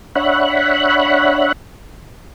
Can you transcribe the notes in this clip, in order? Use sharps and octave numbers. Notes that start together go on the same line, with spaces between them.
D4 C#5 E5 F#5 B5 F#6